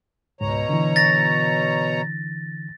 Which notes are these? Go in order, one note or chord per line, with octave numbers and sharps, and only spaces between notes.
C#2 G#2 B2 C#5 A#5
D3 E3
A6 A#6